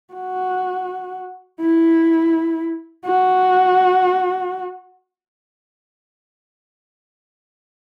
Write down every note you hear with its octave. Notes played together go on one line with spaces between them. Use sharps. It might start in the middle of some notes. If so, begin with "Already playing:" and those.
F#4
E4
F#4